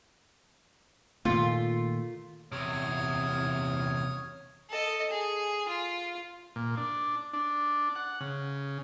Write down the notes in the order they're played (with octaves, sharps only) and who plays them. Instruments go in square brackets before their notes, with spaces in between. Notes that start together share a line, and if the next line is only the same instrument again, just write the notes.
[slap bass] A#2 D#3 A3 [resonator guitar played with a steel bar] F4
[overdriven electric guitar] E2 C3 [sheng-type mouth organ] C#5 D#6 F6
[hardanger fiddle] A4 D#5
G#4
F4
[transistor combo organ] A#2
D4
D4
F#5
C#3